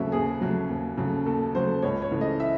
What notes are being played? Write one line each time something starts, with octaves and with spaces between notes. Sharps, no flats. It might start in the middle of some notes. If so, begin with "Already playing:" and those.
Already playing: D#2 C#3 F#3 A3 E5
D#2 G#4
C#3 F#3 A3
D#2
C#3 F#3 A3
D#2 A4
C#3 F#3 A3 C5
C#2 C#5
C#5
C#3 E3 A3
D#5
E5